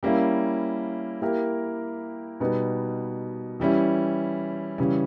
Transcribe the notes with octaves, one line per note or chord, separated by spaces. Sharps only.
G3 A#3 C#4 E4
A#3 E4 G4 A#4
B2 G3 B3 D#4
E3 G3 C#4 E4
C#3 E3 G3 C#4